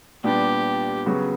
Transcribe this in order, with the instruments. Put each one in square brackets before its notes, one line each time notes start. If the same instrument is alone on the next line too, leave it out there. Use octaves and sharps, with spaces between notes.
[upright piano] A#2 G3 B3 D4 [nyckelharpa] G4
[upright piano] C#3 F#3 B3 F#4